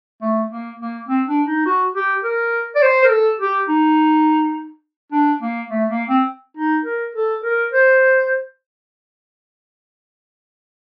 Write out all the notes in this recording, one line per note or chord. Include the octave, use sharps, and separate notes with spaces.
A3
A#3
A#3
C4
D4
D#4
F#4
G4
A#4
D5
C5
A#4
A4
G4
D#4
D4
A#3
A3
A#3
C4
D#4
A#4
A4
A#4
C5